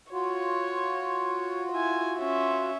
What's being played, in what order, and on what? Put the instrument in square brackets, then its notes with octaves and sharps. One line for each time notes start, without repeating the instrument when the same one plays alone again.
[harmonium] F4 F#4 [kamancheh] C#5
[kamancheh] E4 G#5
C#4 E5